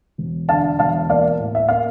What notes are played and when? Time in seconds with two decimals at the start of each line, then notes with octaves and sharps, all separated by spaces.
0.18 E1
0.48 D3 F5 A5
0.79 E1 F5 A5
1.09 A#3 D5 F5
1.40 A2
1.55 E5
1.69 A#3 F5